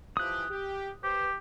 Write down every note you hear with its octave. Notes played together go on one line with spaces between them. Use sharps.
E3 F3 G4 D#6 F#6
G4
G4 B4 C5